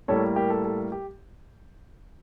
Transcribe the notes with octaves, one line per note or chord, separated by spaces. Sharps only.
A2 G3 A#3 A4 C#5
G4 A#4
A4
A4
G4